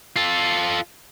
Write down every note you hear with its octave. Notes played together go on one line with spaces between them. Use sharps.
F4 A4